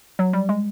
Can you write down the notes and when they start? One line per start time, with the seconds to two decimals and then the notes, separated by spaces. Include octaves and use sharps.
0.19 F#3
0.33 G3
0.49 G#3